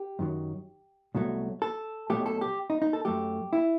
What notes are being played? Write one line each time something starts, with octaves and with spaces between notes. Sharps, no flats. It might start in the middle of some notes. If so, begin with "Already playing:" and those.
Already playing: G4
F#2 D#3 F#3
C2 B2 F#3 A3
A4
B1 B2 F#3 A3 G4
A4
G4
D#4
D#4
A4
F#2 F#3 A3 G4
E4